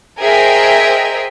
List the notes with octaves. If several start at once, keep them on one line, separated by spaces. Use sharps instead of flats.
G#4 A#4 C5 D#5 E5 G5